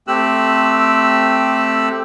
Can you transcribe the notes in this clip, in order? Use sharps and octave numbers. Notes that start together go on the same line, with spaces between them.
A3 C4 G4 E6 F#6